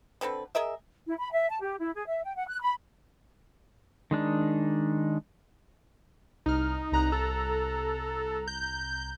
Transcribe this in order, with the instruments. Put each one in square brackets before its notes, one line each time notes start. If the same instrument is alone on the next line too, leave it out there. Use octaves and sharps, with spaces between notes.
[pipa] D3 C4 A4 B4
G#4 A#4 D#5 E5
[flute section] E4
B5
E5
A5
G4
E4
G#4
E5
G5
F#5
F#6
B5
[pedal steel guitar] D#3 G#3 D4 D#4
[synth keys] C2 F6 [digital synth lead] D#4
[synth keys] C2 A#5 F#6
[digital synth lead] A4
G6